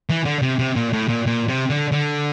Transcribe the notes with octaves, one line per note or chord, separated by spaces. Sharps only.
E3
D3
C3
C3
A#2
A2
A#2
A#2
C3
D3
D3